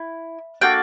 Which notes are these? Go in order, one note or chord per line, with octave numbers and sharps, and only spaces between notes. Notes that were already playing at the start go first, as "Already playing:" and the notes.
Already playing: E4
A#3 D4 F#4 A4 G5